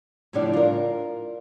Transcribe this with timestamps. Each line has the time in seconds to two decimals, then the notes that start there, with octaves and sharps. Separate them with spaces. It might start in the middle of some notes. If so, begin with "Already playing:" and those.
0.33 A2 C#3 F3 G3 D4 D5
0.53 F4 A#4